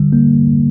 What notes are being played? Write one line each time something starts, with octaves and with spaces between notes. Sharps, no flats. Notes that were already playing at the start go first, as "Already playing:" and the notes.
Already playing: D3 G3
A#3